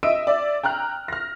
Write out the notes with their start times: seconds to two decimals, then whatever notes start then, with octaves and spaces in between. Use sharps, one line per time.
0.03 D#5 E5 E6 D7 D#7
0.27 D5 E5
0.63 G5 A#5 F6 F#6
1.08 F6 A#6